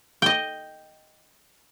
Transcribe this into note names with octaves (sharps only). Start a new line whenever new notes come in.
D#5 G5